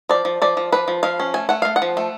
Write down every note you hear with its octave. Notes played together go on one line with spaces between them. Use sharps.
F3 D5
F3
F3 D5
F3
F3 B4
F3
F3 F5
C#4
A3 G#5
A3 F#5
A3 F5
F#5
F3
A3